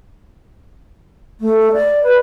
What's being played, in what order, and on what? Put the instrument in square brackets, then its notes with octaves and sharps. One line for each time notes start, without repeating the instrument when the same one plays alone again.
[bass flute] A3
D5
B4